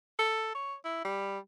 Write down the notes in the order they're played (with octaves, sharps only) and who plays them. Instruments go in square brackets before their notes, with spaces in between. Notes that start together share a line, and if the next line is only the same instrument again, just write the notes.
[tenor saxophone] A4
C#5
E4
G3